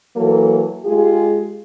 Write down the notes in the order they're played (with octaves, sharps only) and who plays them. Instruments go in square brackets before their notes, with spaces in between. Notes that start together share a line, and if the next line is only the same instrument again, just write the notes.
[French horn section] E3 F#3 A#3 A4
G#3 F4 G4 G#4